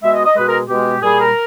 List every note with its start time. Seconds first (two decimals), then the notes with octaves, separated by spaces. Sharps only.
0.03 B2 G#3 E5
0.13 D#5
0.25 D#5
0.36 B2 G#3 B4
0.47 A#4
0.69 B2 G#3 G4
1.02 A#2 G3 G#4
1.19 A#4